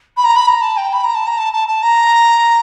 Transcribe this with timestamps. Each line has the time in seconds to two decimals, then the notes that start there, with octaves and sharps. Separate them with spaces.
0.17 B5
0.24 A#5
0.35 B5
0.47 A#5
0.61 A5
0.77 G5
0.93 B5
1.04 A#5
1.14 A5
1.26 A#5
1.38 A5
1.53 A5
1.67 A5
1.82 A#5